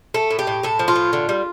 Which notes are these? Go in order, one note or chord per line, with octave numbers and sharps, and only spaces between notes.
A3 A4
A2
G4
A2
A2 A4
F3
F4
A2
D3
G3